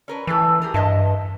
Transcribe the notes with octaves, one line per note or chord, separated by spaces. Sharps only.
C#4 A#4 B4
E3 A3 E4 A4
G4 G#4 A#4
G2 D#5 E5 A5